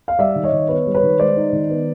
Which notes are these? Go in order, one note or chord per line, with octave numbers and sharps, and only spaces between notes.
F5
G3 D5 E5
D#3
C#5 D#5
D#3
B3 B4 C#5
G3
B4 C#5
D#3
G#3 C5 D5
D#4
D#3
B3